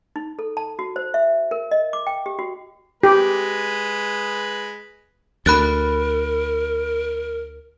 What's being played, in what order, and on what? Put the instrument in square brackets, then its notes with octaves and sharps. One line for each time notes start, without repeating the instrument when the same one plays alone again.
[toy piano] D#4
A4
A5
F#4
C5
E5
A#4
D#5
D6
G5
G4
F#4
[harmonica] G#3 B4 [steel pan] G4
[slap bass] D2 [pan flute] A#4 [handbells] B5 F#6 A6